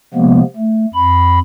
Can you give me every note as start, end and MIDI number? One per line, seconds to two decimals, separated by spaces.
0.14 0.42 48
0.14 0.42 53
0.14 0.42 56
0.14 0.42 58
0.14 0.42 59
0.57 0.86 57
0.94 1.39 41
0.94 1.39 83